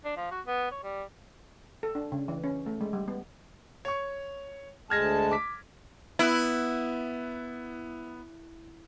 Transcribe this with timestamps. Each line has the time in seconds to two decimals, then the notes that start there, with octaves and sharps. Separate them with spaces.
0.05 D4
0.17 F3
0.31 F#4
0.47 B3
0.72 C#5
0.84 G3
1.83 A4
1.95 D4
2.12 C#3
2.28 E3
2.44 C#4
2.66 A3
2.81 G#3
2.93 G3
3.08 B3
3.85 C#5 C#6
4.90 D2 G#3 A5 F6 G#6 A#6
5.31 D6 B6
6.19 B3 E4 F#6